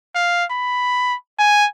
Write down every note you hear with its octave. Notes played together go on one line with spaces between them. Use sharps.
F5
B5
G#5